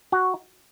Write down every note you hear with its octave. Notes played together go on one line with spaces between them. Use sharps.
F#4